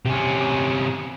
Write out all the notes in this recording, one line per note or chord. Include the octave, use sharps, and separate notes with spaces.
C3 C#4